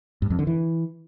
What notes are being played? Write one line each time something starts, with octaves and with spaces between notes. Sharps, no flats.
G2
F2
D3
E3